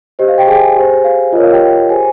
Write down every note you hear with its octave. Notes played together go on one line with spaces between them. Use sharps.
G4 C5 D#5
F5
G4 G5
G#4 G#5
G4 C5
F5
F4 A#4 C#5 D#5
F5
G4 G5
G4 G#4 C5 G#5